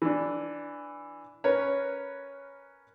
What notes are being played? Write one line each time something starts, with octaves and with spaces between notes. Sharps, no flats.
E3 D4
C#4 A#4 B4 C#5